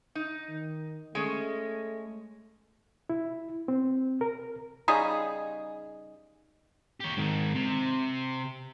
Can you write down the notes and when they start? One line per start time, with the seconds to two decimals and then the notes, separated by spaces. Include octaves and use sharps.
0.15 D#4
0.49 D#3
1.15 G#3 A3 C#4
3.10 E4
3.68 C4
4.21 A#4
4.88 C#3 G3 D#4 G#4
7.00 G4 C#5
7.17 G#2 D#3
7.55 C3